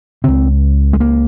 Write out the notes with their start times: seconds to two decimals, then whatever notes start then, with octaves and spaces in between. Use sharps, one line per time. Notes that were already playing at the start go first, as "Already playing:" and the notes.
0.24 C#2 C#3 C4
0.93 G#3
1.00 A#3